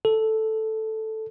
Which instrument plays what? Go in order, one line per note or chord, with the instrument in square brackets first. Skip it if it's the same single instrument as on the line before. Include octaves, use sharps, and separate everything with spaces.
[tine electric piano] A4